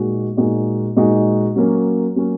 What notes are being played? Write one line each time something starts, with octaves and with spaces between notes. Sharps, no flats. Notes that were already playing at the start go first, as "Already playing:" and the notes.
Already playing: A#2 G#3 D#4 F#4
A#2 G#3 D#4 F#4
A#2 G#3 D#4 F#4
F#3 A#3 C#4
F#3 A#3 C#4